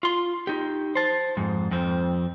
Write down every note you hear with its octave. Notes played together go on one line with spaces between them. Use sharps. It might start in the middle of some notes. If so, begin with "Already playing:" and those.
F4 C6
D#4 G4
C5 A5
F2 G#2
F2 C4